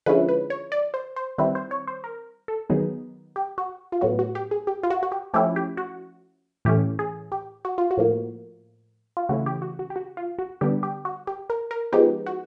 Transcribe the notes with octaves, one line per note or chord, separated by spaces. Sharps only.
D3 F3 G#3 C#4 E4 B4
B4
C#5
D5
C5
C5
D#3 G3 C4 E4 B4
C5
C#5
C5
A#4
A4
D#3 F#3 B3 D#4 G#4
G4
F#4
F4
A2 F#3 B3 F#4
F#4
G4
G#4
G4
F4
F#4
F#4
G4
F3 A3 C#4 E4 G4
G4
F#4
A2 E3 A3 C#4 G4
G#4
G4
F#4
F4
F#4
A2 F3 A#3
F4
C#3 E3 A3 C#4 E4 F#4
G4
F#4
F#4
G4
F#4
F4
F#4
D3 G3 B3 D4 G4
G4
F#4
G4
A#4
A#4
F3 G#3 B3 D#4 G4
F#4